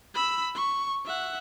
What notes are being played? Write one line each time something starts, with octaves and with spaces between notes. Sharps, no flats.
B5 E6
C#6
E5 F#5